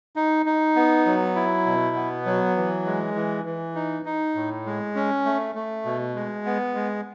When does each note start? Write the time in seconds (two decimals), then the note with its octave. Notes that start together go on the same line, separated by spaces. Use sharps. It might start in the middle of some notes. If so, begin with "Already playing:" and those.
0.16 D#4
0.46 D#4
0.76 B3
1.06 F#3
1.36 E4
1.66 B2
1.96 B3
2.26 F#3
2.56 E3
2.86 G#3
3.16 E3
3.46 E3
3.75 D#4
4.05 D#4
4.35 A2
4.66 G#3
4.95 C#4
5.25 A3
5.55 A3
5.85 B2
6.15 G#3
6.45 B3
6.75 G#3